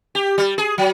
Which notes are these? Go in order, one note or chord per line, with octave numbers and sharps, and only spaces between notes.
G4
G3
G#4
F#3